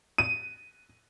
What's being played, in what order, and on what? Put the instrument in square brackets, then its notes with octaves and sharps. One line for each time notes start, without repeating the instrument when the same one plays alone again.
[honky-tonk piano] D#7